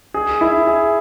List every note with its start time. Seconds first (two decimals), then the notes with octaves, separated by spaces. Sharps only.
0.14 G#4
0.41 E4
0.67 G#4